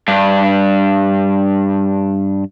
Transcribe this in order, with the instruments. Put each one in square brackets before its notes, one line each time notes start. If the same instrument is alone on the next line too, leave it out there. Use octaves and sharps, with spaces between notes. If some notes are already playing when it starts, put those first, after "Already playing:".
[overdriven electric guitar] G2 D4